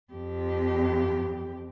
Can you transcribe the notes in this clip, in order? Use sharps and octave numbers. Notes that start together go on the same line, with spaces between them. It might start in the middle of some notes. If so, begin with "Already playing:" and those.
F2 G4